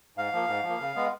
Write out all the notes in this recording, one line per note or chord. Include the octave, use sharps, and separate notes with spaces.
G#2 F5
F3 A#3
G#2
F3
A#3
C#3
G#3 B3